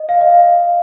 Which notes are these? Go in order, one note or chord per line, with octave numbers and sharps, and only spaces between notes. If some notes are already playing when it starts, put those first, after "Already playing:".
Already playing: D#5
F5
D#5